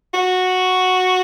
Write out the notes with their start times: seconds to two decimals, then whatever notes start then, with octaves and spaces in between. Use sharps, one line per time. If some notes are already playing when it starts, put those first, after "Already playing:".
0.14 F#4